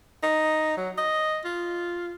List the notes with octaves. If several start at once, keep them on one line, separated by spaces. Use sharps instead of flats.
D#4
F#3
D#5
F4